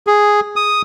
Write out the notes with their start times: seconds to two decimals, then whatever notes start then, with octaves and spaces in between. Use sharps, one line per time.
0.07 G#4
0.56 D#6